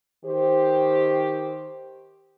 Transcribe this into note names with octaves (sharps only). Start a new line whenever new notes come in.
D#3 G4 C5